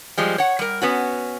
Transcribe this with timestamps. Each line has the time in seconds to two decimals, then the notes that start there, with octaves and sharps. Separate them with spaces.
0.18 F3 G3 G#3
0.38 C#5 F#5
0.59 G3 A#4
0.82 B3 C#4 F#4